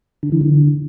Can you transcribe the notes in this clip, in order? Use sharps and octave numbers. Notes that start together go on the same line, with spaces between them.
D3
E3
D3